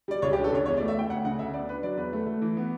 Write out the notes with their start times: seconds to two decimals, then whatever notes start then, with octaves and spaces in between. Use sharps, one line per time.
0.08 G3 D5
0.22 C#2 C#5
0.33 G4
0.37 D4
0.44 A4
0.52 C#2 C#5
0.66 E2 C#5
0.77 D5
0.80 A3
0.88 E5
0.95 A3 G5
1.10 D2 F#5
1.25 C#3 F#5
1.39 D2 E5
1.54 B3 D5
1.69 D4 B4
1.83 F#3 D5
1.97 E2 B4
2.13 A3
2.26 A3
2.42 E3
2.57 B3